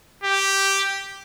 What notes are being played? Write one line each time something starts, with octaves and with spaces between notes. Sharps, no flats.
G4